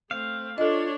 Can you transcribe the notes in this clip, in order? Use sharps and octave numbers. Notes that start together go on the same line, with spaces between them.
A3 C4 F5
D4 F4 A4 C#5 D#5